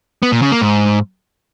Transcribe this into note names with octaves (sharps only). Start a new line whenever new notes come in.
B3
A#2
C#3
A#3
G#2